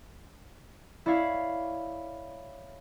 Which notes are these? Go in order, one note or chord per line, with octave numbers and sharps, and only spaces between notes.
E4 C#5 D5 F5